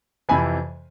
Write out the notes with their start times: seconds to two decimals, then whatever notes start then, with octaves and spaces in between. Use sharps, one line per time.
0.29 F2 C3 E3 G#5 B5